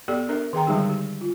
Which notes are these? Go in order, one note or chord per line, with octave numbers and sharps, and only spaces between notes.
B3 G4 A4 D5
D4 A#4 E5
D#3 G#4 G5 A#5
D3 F3 G3 G#3 D#4 G4
G4
F4